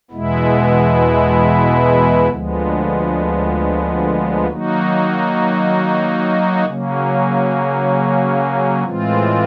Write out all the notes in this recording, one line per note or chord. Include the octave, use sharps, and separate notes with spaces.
E2 B2 G#3 B3 E4
D2 D3 F3 G#3 B3
D#3 F#3 A#3 D#4 F#4
C#3 F#3 A#3 C#4
A2 E3 G#3 C4 F4